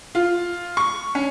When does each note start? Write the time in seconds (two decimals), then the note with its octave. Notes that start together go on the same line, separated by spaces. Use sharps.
0.15 F4
0.77 C#6
1.15 C#4